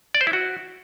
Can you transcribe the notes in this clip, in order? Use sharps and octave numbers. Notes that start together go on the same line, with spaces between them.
D5
C5
E4
F#4